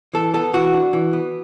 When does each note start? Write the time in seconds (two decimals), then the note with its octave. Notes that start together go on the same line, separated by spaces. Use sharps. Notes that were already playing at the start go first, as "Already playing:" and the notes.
0.14 E3 A4
0.34 B3 A4
0.54 E3 F#4
0.73 D4
0.93 E3
1.13 B3